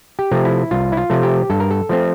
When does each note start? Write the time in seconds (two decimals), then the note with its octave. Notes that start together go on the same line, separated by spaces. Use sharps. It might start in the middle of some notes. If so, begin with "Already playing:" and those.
0.19 G4
0.32 C3 F3 A3
0.45 E4
0.71 C2 F4
0.92 E4
0.97 F4
1.10 C3 F3 A3
1.23 G4
1.50 G2 A4
1.60 A#4
1.71 A4
1.89 F3 A3 C4